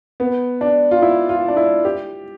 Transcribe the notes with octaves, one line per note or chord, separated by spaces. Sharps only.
B3
D4
F4
E4
F4
D4
E4
G4